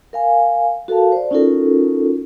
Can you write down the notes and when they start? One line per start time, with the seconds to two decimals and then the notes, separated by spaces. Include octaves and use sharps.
0.13 A#4 F5 G#5
0.88 F#4 A4 A#4 F5 A5
1.12 C5 D5
1.31 C#4 D#4 F4 F#4 A4 A#4